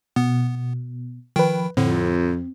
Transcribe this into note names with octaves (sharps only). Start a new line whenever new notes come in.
B2 B3
D#3 F3 B4 G5
F2 A2 D3 C4